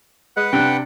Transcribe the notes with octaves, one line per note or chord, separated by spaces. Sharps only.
G#3 B4 F#5
C3 D4 G5